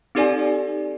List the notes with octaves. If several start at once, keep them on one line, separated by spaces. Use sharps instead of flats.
C4 D#4 G4 A4 D5 G#5